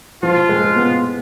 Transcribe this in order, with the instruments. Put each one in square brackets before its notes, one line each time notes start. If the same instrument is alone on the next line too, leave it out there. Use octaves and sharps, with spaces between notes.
[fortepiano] F3 [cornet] F4
[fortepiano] G#3
B3